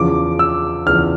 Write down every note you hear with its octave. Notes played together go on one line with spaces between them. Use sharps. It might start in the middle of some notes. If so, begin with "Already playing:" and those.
Already playing: E2 C#3 F3 D6
E6
E2 C#3 F3 F6